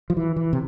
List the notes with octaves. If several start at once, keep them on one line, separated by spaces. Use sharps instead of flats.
F3
E3
E3
C3